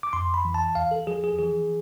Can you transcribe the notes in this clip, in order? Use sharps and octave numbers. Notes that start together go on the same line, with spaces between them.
D6
F2 C6
B5
E3
A5
E2 F5
A4
F3 G#4
G#4
E3 G#4